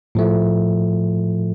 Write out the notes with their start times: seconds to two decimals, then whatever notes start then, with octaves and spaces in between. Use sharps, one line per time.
0.15 A2 F3 A3